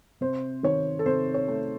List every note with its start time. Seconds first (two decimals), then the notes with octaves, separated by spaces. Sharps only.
0.21 C3 C5
0.63 D#3 C#5
0.99 A4
1.06 C3 C5
1.34 C#5
1.48 A3